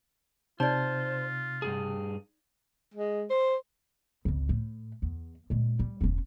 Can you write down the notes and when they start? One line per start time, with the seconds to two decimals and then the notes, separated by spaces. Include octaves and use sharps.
0.60 C3 D#4 F4 C5 D5
1.62 G2 B2 G#4
2.94 G#3
3.30 C5
4.25 G#1 C#2
4.49 A2
5.02 E2
5.50 A#2 G#3
5.79 G3
6.01 E1 C#4